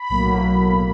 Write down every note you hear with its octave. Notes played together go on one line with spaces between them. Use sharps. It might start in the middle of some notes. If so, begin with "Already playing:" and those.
Already playing: B5
B1 A2 F#3 A#3